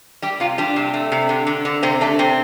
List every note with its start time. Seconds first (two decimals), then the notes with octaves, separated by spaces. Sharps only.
0.22 G3 G4
0.40 C3 F4
0.58 G3 D4
0.76 C3
0.94 A3
1.12 C3
1.29 D3
1.47 D3
1.65 D3
1.83 C3 C4
2.01 A3 D4
2.19 C3 C4